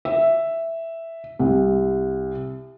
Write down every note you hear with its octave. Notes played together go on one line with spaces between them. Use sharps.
E5
C2